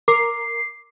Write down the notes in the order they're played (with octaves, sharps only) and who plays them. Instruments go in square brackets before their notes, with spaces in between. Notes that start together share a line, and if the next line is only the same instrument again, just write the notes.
[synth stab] A#4 [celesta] D6 [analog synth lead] C7